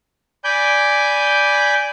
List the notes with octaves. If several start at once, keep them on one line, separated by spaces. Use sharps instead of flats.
D5 G#5 B5 G6